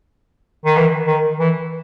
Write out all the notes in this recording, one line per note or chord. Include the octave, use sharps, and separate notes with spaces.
D#3
E3
D#3
E3